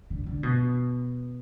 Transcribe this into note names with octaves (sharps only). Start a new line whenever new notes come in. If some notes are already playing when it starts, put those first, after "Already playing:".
D3
D3
B2